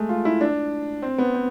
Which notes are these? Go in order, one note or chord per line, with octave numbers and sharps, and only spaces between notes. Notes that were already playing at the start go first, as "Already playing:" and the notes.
Already playing: G#3 A3
F4
E4
D4
C4
B3
C4